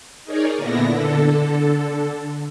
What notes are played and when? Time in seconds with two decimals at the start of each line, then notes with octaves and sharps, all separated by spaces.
0.24 D#4 G#4 A#4 C#5 D5
0.56 A#2 D3 B3 E4 A#6
0.87 D3 A4